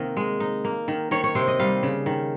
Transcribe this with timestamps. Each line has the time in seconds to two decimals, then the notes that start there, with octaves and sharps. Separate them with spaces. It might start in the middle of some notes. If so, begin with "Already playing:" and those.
Already playing: C3 D#3 A#3 D#5
0.17 G#3
0.40 D#4
0.65 A#3
0.88 D#3
1.11 D#3 C#5
1.24 C#5
1.35 C3 C5
1.48 D#5
1.59 G3 F5
1.83 C#3
2.06 D#3